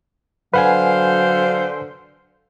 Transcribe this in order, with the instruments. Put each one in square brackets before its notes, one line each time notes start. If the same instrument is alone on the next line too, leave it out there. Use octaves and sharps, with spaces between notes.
[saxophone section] D3 C5 [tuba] F#3 [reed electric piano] B4 F#5 G#5 [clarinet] F5